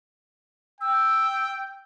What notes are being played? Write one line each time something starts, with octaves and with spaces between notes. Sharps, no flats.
G5 E6